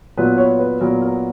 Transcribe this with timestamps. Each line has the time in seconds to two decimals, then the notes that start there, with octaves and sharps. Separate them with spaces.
0.17 A#2 F#3 B3 B4
0.38 C#5
0.59 B4
0.81 A#2 F#3 B3 A#4
1.02 A#4